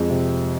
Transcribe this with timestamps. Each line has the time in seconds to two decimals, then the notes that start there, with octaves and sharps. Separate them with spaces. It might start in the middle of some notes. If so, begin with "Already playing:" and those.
Already playing: F2 G#3
0.10 C3